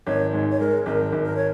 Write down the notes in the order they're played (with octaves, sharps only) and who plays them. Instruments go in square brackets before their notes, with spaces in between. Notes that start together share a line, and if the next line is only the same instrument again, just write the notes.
[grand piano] G#1 [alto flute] C#5
[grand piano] G#2
[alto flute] C#5
[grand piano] G#3 [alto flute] A#4
[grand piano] G#1 [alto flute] A#4
[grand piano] G#1
[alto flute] A#4
C#5